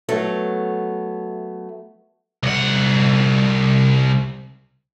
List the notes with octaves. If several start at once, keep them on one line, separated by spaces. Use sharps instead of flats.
F#3 A3 B3
C2 F#5